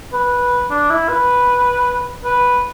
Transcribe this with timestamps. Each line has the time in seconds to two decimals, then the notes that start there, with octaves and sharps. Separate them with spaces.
0.13 B4
0.71 D4
0.90 E4
1.09 B4
2.25 B4